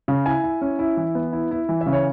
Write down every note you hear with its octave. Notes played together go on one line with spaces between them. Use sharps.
C#3
E4 G#5
E4
C#4
E4
E3
B3
E4
E4
E3
E5
C#3
C#5